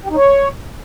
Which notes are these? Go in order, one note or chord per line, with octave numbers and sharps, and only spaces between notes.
G4
D#4
C#5